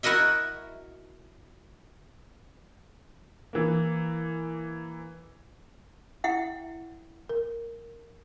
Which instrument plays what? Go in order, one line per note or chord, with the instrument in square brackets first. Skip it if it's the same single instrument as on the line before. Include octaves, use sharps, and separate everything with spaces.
[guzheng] E4 F#4 A#4 D#5 E5
[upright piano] E3 A#3
[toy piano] E4 E5 F#5 G5
[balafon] A#4